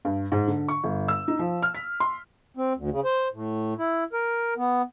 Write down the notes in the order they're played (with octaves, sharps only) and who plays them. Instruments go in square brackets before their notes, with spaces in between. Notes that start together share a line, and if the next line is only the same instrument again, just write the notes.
[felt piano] G2
G#2
D3
C#6
G1
E6
D#4
F3
F6
B6
C6
[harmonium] C4
D2
C#3
C5
A2
E4
A#4
B3